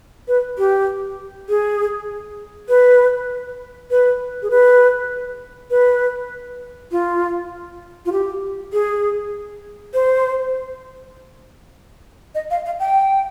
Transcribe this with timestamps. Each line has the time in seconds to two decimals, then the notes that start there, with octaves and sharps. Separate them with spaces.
0.28 B4
0.58 G4
1.49 G#4
2.69 B4
3.91 B4
4.43 G#4
4.51 B4
5.70 B4
6.91 F4
8.06 F4
8.12 G4
8.73 G#4
9.94 C5
12.35 D#5
12.51 F5
12.66 F5
12.80 G5